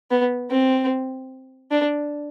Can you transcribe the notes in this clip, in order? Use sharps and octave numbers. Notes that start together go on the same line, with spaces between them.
B3
C4
D4